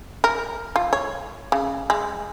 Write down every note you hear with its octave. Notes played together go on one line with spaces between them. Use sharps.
A#4
F4
C#5
C#3
G#3